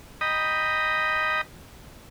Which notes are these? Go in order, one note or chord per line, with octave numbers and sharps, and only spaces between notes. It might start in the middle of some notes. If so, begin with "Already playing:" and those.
D#5 G5 A#5 B5 D#6